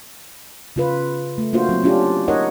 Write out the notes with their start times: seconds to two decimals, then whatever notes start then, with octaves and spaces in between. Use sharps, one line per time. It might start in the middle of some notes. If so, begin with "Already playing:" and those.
0.76 C#3 F4 B4
1.38 A3
1.53 A#3 D4 F4 F#4 C5
1.69 F#3 C4
1.84 C#4 D4 F4 G4
2.28 D#4 A#4 C#5 D#5 F#5